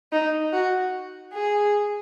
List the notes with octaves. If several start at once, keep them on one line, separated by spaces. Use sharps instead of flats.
D#4
F#4
G#4